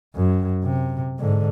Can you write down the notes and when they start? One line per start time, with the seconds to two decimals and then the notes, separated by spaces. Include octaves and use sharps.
0.15 F#2
0.64 C3
1.19 G#2 D3